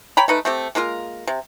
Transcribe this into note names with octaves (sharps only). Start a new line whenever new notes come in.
C#5 G5 A#5 B5
A3 D#4 B4
A3 C4 G4
G#3 A#3 F4 A#4
C3